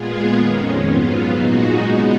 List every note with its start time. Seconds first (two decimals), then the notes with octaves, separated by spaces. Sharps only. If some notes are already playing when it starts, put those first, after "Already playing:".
Already playing: A#2 G#3 B3 F4 G#4
0.36 F2 D#3 G#3 C#4
0.85 G#2 F#3 B3 F4
1.33 A#2 G#3 D#4 F#4
1.82 C#3 G#3 B3 D#4